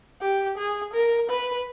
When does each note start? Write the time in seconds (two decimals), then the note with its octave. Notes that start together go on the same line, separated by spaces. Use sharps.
0.22 G4
0.57 G#4
0.93 A#4
1.30 B4